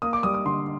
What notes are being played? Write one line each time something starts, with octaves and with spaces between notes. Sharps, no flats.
A#3 D#6
D6
G3 D#6
D#6
D3 C6